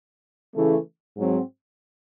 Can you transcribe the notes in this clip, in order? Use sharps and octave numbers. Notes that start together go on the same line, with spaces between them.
C#3 E3 A3
G#2 F#3 C4